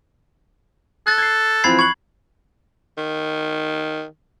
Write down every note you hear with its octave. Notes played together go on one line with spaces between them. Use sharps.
A4 F#6 A6
G#6 C7
E3 F3 C4 B5 G#6 C7
C#6 F#6 G#6 F#7
D#3